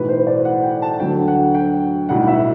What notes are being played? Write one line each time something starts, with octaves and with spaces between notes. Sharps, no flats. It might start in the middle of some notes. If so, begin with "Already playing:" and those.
Already playing: B1 A2 E3 B4
C5
D5
F#5
G5
A5
D2 D3 F#3 G5
F#5
G5
B1 A2 G3 F#5
E5